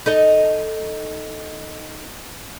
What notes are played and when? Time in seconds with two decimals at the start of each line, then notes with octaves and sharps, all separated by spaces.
0.06 D#4 A4 D#5